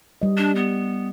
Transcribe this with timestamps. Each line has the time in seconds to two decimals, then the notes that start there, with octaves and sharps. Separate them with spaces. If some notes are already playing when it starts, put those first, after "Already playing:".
0.22 G3 D#5
0.37 D4
0.56 B3